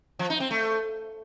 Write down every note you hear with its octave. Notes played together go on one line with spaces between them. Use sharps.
F3
D#4
C4
A3